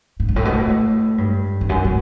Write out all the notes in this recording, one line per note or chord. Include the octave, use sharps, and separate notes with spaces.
A2
G2
A2
B2
A2
G2
E2
F#2
A2